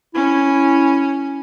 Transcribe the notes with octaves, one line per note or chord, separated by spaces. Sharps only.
C#4 E4